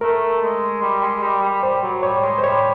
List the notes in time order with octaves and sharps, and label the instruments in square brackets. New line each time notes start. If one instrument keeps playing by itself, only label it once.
[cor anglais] A3 [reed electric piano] A#4
[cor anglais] G#3
G3
G#3
G3
G3
[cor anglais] G3 [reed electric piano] C5
[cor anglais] F#3
[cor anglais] G3 [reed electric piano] C#5
[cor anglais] G#3
[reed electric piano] C5
[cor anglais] G3 [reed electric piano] C#5